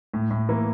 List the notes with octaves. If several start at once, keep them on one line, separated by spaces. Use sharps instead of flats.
A2
A2
E3 A#3